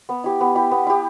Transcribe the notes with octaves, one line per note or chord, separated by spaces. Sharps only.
B3
E4 G4
B3
E4 G4
B3
E4 G4